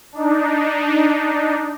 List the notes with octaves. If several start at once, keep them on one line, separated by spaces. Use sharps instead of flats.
D4 D#4